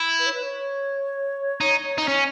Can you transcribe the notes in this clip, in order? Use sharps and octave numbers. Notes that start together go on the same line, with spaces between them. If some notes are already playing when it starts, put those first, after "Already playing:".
Already playing: E4
B4
C#5
B4
C#5
D#4
D#4
C#4